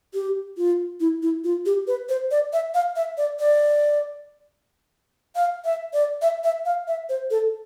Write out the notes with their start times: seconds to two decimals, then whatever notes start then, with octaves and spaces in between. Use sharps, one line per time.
0.14 G4
0.57 F4
1.00 E4
1.22 E4
1.44 F4
1.66 G4
1.87 B4
2.09 C5
2.31 D5
2.53 E5
2.74 F5
2.96 E5
3.18 D5
3.40 D5
5.36 F5
5.65 E5
5.94 D5
6.22 E5
6.44 E5
6.65 F5
6.88 E5
7.09 C5
7.31 A4